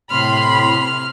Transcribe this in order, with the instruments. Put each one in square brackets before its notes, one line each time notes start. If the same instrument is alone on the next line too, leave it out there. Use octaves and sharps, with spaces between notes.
[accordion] A2 C6 [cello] C3 [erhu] B5 [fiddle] F6